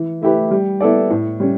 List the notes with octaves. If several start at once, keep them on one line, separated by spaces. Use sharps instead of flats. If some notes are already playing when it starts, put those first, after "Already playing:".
Already playing: E3
A3 E4 G4 B4
G3
B3 E4 A4 D5
A2
G3 C#4